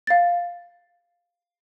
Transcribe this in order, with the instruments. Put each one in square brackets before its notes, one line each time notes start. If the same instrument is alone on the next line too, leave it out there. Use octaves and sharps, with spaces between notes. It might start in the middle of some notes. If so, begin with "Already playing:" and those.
[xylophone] F5 A6